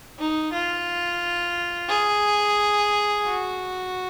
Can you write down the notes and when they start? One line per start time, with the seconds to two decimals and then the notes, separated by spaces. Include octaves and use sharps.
0.19 D#4
0.53 F4
1.89 G#4
3.25 F#4